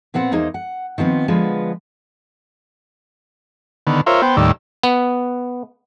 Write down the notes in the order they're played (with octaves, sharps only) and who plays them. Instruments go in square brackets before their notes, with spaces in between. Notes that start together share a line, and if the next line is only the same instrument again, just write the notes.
[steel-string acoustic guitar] A#2 B3 C4 F#5
E2 A#3 D#4 G#4 C5
F#5
D#3 F3 B3 C4
D3 F3 G#3 B3 B4
[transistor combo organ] D3 D#3 B3
F4 A#4 C5 C#5 E5
B3 C5 G5
D#2 A2 D#3 G3 D5 E6
[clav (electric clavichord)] B3